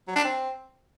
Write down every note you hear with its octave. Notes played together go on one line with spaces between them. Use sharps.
F#3
D4
C4